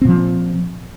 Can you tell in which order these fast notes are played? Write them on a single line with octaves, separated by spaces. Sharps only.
C4 A#2 F3